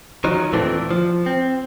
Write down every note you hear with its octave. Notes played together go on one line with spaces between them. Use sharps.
D#3 F3 F#3 D#4
D#2 A#2 E3 A3 C4 D4
F3
C4